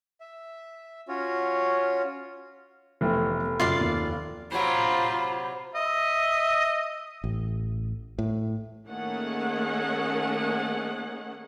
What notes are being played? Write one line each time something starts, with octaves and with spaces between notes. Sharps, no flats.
E5
C#4 F4 F#4 C#5
F1 E3 A3 B3
F#2 C#3 F4 D5 F5
D#2
C3 F#3 F4 C5 A#5 B5
D#5 E5
A1
A2
D#3 A3 A#3 C#4 G#4 F#5